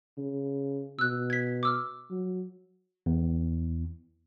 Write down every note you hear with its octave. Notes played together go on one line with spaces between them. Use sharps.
C#3
B2 E6 F#6
G#6 B6
D6 E6 F6
F#3
E2